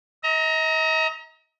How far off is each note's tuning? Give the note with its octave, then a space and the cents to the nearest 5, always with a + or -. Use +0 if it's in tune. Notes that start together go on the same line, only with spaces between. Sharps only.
D#5 +40 A#5 +0